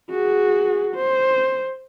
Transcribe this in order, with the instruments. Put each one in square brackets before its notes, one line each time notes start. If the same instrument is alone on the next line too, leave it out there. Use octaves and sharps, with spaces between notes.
[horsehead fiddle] F#4 G#4
C5